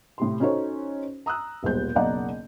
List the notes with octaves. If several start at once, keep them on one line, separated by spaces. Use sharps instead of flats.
A2 C3 C6
C#4 D#4 F#4 A4 C5 C#5
A#5 D#6 E6 F#6
D#1 B1 G3 G#3 C5 G6
F#1 B1 D5 D#5 F#5 A#5